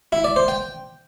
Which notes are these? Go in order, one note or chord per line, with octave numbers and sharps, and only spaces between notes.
E4
D5
C5
G5